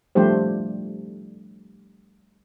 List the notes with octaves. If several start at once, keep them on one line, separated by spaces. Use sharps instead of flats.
F3 G3 A3 D4 G4 C5